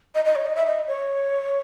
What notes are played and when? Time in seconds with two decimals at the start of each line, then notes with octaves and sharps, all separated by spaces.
0.15 D#5
0.25 D#5
0.35 C#5
0.46 D#5
0.56 E5
0.67 D#5
0.88 C#5